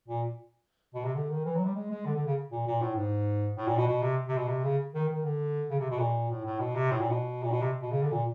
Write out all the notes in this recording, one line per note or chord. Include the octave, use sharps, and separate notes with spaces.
A#2
B2
C3
D3
D#3
E3
F#3
G3
G#3
G#3
D3
D3
C#3
A#2
A#2
A2
G#2
A2
A#2
B2
B2
C3
C3
B2
C3
C#3
D#3
D#3
D3
C#3
C3
B2
A#2
A2
A2
B2
C3
A2
A#2
B2
A#2
B2
C3
B2
C#3
D3
A#2